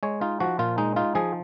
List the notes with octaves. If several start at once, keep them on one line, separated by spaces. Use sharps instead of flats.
G#3 C#5
D#4 F4
F3 F#4
A#2 F4
G#3 D#4
D#4 F4
F3 G#4